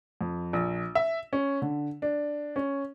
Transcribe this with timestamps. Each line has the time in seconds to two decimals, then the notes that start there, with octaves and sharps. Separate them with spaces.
0.21 F2
0.53 A#1
0.95 E5
1.33 C#4
1.62 D3
2.02 D4
2.56 C#4